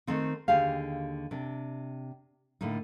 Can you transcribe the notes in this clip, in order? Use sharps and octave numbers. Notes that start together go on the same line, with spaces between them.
D#3 A3 C4 D#4
D#2 D3 G4 G#4 F5
C3 D4
A2 D3 A#3 D#4